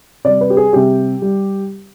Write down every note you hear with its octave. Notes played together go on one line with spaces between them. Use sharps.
C3 G3 D5
B4
G4
G#4
C3 G3 G4
G3